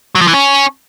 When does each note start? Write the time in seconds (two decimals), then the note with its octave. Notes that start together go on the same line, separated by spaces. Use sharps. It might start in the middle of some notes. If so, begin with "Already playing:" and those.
0.15 F#3
0.21 F3
0.27 E3
0.34 C#4